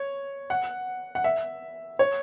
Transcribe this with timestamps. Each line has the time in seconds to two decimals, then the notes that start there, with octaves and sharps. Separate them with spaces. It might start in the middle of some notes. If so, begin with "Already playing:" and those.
Already playing: C#5
0.50 F#5
1.15 F#5
1.24 E5
1.99 C#5